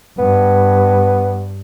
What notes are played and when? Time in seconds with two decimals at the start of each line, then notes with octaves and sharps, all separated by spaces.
0.18 G2 B3